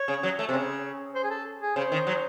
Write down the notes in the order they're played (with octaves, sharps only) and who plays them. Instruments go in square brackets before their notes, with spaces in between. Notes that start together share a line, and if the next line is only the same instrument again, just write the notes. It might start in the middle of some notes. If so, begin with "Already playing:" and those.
Already playing: [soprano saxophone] C#5
[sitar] C#3
F#3
A3
C3
C#3
[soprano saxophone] C5
G#4
A4
G#4
[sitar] C#3 [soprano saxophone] C5
[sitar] D#3
F#3